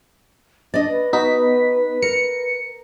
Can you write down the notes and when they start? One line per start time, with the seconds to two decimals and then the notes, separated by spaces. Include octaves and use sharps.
0.74 D4 D5 D#5
0.90 B4
1.13 B3 D#4 F#4 B6
2.02 A#4 C#7